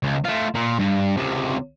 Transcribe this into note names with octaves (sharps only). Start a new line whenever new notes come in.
C#2
A3 F4
A#2
G2
C#2 C3